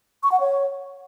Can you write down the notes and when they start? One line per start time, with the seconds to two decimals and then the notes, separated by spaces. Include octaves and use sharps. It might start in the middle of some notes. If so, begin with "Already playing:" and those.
0.23 C#6
0.32 F#5
0.40 C#5